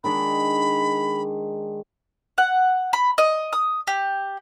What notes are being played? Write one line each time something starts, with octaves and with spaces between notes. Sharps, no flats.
D#3 G#3 D4 B5
F#5
B5
D#5
D#6
G4